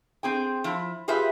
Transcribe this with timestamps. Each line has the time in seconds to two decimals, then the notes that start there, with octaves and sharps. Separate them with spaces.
0.23 C4 G#4 G5
0.64 F3 E4
1.08 F4 G4 G#4 B4 E5